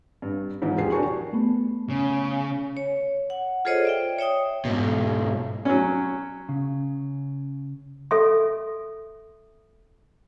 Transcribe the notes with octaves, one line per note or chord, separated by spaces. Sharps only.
G2
G#2 E3 F3
E1 F3 G4 G#4 C7
D4 F#4 G4 A#4 G#5 C#6
A3 B3
C#3
C#5
F#5
F4 G#4 A4 C5 C#5 D#5
D5 E5 G5
C#5 E5 G5 D#6
G#2 B2
F#3 C#4
C#3
A4 E5 C6